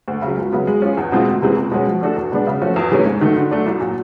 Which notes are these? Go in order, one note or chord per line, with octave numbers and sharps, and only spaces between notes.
D2
C#3
F#3
C#2
C#3 F#3 B3
G#3
C#4 F4 G#4
E2
B2 G#3 C4 F4
D2
C3 E3 G#3 C4
C#2
B2 G#3 C#4
F3
A3 D4 F#4 A4
E2
B2 G#3 B3 D4
C#3
F3 A3 C#4 F#4
E2
C3 E3 A3 C#4
G#2
D#3 F#3 A3
D3
F#3 A3 D4
C2
A#2 F#3